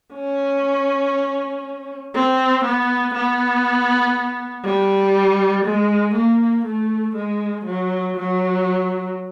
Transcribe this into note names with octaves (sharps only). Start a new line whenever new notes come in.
C#4
C4
B3
B3
G3
G#3
A#3
A3
G#3
F#3
F#3